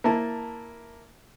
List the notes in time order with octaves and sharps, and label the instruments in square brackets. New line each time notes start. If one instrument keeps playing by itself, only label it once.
[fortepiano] A#3 E4 A5